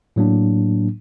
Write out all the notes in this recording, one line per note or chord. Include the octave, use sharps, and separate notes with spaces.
A2 F#3 A#3 D4